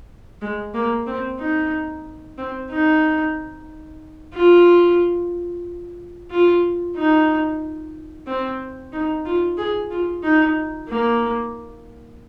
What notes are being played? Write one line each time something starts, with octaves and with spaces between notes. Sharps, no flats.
G#3
A#3
C4
D#4
C4
D#4
F4
F4
D#4
C4
D#4
F4
G#4
F4
D#4
A#3